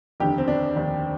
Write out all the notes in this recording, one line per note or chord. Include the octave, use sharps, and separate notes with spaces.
F1 D#2 D3 G4
C4
D4
F1 D#2 D3